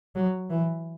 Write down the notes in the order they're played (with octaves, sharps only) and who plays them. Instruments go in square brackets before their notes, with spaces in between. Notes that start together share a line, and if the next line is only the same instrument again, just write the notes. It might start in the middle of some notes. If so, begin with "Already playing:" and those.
[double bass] F#3
E3